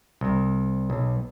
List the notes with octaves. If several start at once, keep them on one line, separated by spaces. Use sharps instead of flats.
C2
B1